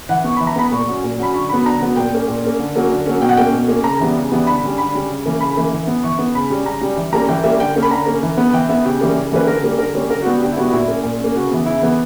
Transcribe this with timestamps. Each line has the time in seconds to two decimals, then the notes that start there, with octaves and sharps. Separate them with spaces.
0.09 E3 F#5
0.24 B3 C#6
0.36 E3 B5
0.47 A#5
0.56 B3 B5
0.71 A#2 C#6
0.87 F#3 C#4
1.03 A#2
1.18 F#3 C#4 B5
1.34 D3 C#6
1.49 F#3 B3 B5
1.65 D3 A#5
1.81 F#3 B3
1.96 A#2 G5
2.13 A#3 C#4
2.28 A#2
2.44 A#3 C#4
2.59 D3
2.75 F#3 A#3 C#4
2.90 D3
3.06 F#3 A#3 C#4
3.22 B2 G5
3.29 F#5
3.37 A#3 C#4 G5
3.53 B2
3.68 A#3 C#4
3.84 C#3 A#5
4.00 E3 G3 B3
4.16 C#3
4.32 E3 G3 B3
4.47 D3 B5
4.62 G3 C#4
4.78 D3 B5
4.93 G3 C#4
5.10 C#3
5.26 E3 A#3 C#4
5.40 C#3 B5
5.56 E3 A#3 C#4
5.73 E3
5.87 B3
6.03 E3 C#6
6.19 B3
6.34 C#3 B5
6.50 G3 C#4
6.66 C#3 A#5
6.81 G3 C#4
6.97 E3
7.13 G3 A#3 C#4 A#5
7.29 E3 G5
7.44 G3 A#3 C#4 E5
7.60 D3 G5
7.76 A#3 C#4
7.83 B5
7.91 D3 A#5
8.06 A#3 C#4
8.23 E3
8.37 B3
8.53 E3 G5
8.69 B3 E5
8.85 C#3 G4
9.00 E3 G3 A#3 C#4
9.16 C#3
9.32 E3 G3 A#3 C#4 B4
9.47 D3 A#4
9.63 G3 A#3 C#4
9.78 D3 A#4
9.94 G3 A#3 C#4 C#5
10.10 D3 A#4
10.22 F#4
10.25 G3 B3 G4
10.42 D3 G4
10.53 E4
10.57 G3 B3 F#4
10.68 F#4
10.73 A#2 E4
10.88 A#3 C#4
11.03 A#2
11.20 A#3 C#4
11.35 C#3 F#4
11.51 E3 B3
11.66 C#3 E4
11.82 E3 B3